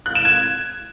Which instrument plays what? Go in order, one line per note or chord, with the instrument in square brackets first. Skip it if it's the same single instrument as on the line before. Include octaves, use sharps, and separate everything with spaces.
[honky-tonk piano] F#6
E7
G#6